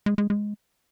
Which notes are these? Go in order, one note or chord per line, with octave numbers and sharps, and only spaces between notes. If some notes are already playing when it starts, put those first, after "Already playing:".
G#3
G#3
G#3